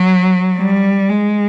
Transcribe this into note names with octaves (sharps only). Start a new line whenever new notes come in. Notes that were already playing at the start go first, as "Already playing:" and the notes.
Already playing: F#3
G3
G#3